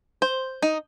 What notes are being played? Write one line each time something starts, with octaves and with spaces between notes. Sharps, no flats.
C5
D#4